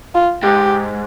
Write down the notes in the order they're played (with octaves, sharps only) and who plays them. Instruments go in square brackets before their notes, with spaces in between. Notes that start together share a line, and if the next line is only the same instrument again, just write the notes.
[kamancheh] F4
[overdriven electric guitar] G#2 [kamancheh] G4